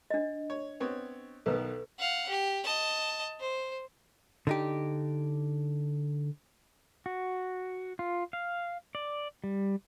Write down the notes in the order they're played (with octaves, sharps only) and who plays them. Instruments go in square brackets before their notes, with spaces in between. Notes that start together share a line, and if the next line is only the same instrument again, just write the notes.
[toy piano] D4 D#5
[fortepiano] C#5
B3 C4 C#5
[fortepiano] B1 D#3 B3 [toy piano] A4 B4
[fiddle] F5 F#5
G4
D#5 A5
C5
[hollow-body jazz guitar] D3 D#4 G4
[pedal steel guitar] F#4
F4
F5
D5
G3